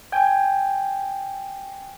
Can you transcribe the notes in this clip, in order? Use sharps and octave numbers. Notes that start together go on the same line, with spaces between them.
G5 G#5